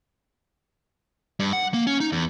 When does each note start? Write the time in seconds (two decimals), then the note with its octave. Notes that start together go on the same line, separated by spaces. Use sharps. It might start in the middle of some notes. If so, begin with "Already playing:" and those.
1.40 G2
1.53 F#5
1.74 A#3
1.87 C#4
2.00 D#4
2.12 E2